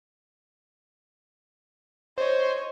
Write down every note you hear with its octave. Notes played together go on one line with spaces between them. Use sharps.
C5 C#5 D#5